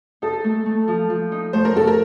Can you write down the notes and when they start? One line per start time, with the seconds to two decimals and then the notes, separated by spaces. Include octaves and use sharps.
0.22 D#4 A4
0.44 A3
0.66 A3
0.88 F3
1.10 F3
1.32 D#4
1.53 A3 C5
1.65 A#4
1.75 A3 A4
1.87 A#4